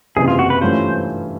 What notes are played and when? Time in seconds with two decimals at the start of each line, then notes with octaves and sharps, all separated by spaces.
0.16 F#1 E2 C3 E3 G#4
0.28 F4
0.39 F#4
0.50 B4
0.61 G2 E3 A3 C#4 F4 C5